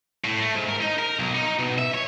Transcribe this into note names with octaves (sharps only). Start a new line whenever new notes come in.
A2
A3
G#2
A#4
D#4
A#4
B1
D#4
B2
E5
C#5